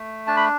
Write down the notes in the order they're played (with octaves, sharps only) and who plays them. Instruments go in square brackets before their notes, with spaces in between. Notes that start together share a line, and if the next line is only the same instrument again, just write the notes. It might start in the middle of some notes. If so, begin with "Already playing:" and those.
Already playing: [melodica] A3
D4 A5
B5